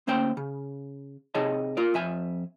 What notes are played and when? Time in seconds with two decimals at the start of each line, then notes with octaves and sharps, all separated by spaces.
0.07 D2 A#3 C#4 C5 G5
0.37 C#3
1.35 C3 D#4 G#4 C#5 D#5 A5
1.77 F4 A#4 D5
1.94 F2 E5 G#5